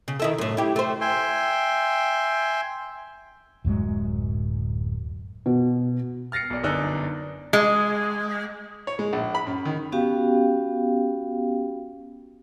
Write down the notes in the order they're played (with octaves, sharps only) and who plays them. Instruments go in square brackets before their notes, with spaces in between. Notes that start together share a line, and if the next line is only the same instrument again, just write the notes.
[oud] C#3
D#3 E4 A4
F#2 A2
E4 G4
A3 C5
[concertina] E5 G5 G#5 C6
[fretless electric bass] D1 F#2 F#3 G#3
[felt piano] B2
[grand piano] F6 A6 A#6 C7 C#7
B1 D5
G1 F#2 D4 D#4 E6 F#6
[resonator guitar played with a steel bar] G#3
[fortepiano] C#5
G#3
A#1
B5
F#2
D#3
[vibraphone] B3 C#4 F#4 G4 F5 G5